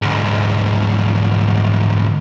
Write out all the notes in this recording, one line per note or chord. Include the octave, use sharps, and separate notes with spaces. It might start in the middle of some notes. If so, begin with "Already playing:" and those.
D2 G#2